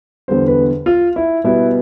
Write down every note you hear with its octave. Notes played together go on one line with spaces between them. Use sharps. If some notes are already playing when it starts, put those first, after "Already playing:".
E2 D3 G3 B3 C5
B4
F4
E4
B2 G3 B3 E4